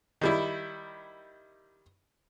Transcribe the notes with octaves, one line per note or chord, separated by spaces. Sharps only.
D#3 G3 E4